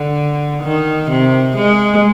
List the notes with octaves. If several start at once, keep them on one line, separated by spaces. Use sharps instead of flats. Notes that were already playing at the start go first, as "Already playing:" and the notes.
Already playing: D3
D#3
C3
G#3